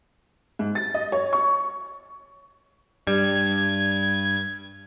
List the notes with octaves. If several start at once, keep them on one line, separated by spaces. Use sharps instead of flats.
G#2
A6
D#5
C#5
C#6
G2 G3 G#6